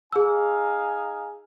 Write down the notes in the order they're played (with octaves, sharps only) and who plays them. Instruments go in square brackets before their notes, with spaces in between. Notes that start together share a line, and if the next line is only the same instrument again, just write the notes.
[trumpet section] D#4 F5 G#5 [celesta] G#4 E6